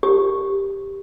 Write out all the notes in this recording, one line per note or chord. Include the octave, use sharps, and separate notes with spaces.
G4